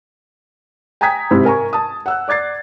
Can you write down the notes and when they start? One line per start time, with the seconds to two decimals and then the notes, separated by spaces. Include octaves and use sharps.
1.01 G5 G#5 A#5 D#6 G#6 B6
1.31 G#2 C3 E4
1.45 A#4 G#5 A#5 C#6
1.73 A5 D#6
2.06 F#5 E6 F#6
2.28 D5 D6 G#6 A6 C7